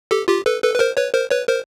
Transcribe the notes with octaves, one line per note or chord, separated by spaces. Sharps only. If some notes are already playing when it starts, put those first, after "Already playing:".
G4 A4
F4 G4
A4 B4
A4 B4
B4
A#4 C5
B4 C#5
A#4 C5
B4 C#5
A#4 C5